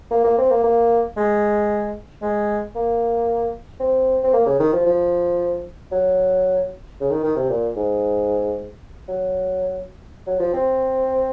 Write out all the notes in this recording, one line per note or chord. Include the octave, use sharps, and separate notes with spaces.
A#3
A#3
C4
A#3
A#3
G#3
G#3
A#3
C4
C4
A#3
C#3
D#3
F3
F3
F#3
C#3
D#3
D#3
C3
A#2
G#2
F#3
F#3
F3
C4